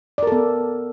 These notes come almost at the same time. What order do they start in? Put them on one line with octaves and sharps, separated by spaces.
D5 A#4 A4 B3